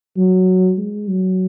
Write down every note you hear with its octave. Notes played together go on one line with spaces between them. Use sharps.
F#3
G#3
F#3